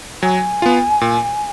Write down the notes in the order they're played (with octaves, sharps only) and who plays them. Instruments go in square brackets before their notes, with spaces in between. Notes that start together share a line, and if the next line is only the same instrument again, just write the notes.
[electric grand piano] F#3 [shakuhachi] G#5
[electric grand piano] B3 F4
A#2